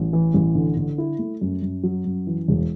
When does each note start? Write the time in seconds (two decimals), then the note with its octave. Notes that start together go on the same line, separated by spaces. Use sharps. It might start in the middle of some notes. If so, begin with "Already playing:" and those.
Already playing: A1
0.13 E3
0.34 A1
0.55 D3
0.77 D3
0.98 E4
1.19 A3
1.41 F#2
1.62 F#2
1.83 F#3
2.05 F#2
2.27 E3
2.48 E1